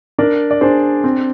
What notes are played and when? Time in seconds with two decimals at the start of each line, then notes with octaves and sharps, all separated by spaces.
0.18 D4 A#4 D5
0.51 D5
0.61 D4 G#4 C5
1.04 C4